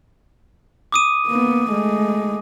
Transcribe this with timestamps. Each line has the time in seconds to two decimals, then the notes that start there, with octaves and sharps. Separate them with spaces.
0.92 D6 D#6 D#7
1.27 A#3 B3
1.70 G#3 A3